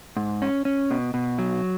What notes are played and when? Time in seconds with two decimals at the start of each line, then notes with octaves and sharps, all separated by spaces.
0.16 G#2
0.42 C#4
0.65 C#4
0.91 B2
1.14 B2
1.39 F#3